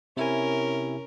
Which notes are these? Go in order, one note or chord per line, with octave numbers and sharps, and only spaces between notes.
C3 C#4 E4 A#4 G#5